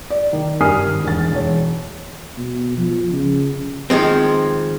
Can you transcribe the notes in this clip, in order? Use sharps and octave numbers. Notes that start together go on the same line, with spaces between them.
D5
D#3
G2 A#4 G#5 D#6 F6 C7
G#1
E1 A6
E1 C#5
B2
F3
C#3
D#3 F3 G#3 C4